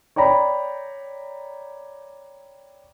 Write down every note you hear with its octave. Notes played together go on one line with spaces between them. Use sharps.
C#5 D5 G5 A#5 B5